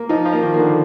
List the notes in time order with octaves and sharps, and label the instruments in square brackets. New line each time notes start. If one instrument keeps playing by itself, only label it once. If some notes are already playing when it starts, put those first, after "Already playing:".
Already playing: [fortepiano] A#3
[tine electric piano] F3 [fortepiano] D#4
[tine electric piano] F3
[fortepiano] A#3
[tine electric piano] D#3
[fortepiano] A#3
[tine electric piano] D3